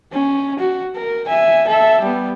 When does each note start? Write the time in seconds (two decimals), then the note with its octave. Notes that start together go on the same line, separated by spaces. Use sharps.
0.12 C#4
0.59 F#4
0.95 A#4
1.27 E5 G#5
1.68 A4 E5
2.01 G3 B3